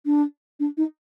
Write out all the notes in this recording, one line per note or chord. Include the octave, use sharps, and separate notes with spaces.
D4
D4
D#4